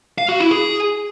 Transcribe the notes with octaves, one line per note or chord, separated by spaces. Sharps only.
F5
F#4
E4
G#4